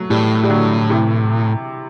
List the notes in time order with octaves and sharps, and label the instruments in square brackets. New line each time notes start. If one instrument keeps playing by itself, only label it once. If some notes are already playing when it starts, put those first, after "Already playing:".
Already playing: [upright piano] F#3 A3
[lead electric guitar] A2 [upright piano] E3 G3
[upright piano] G3
D3 F#3
C3 E3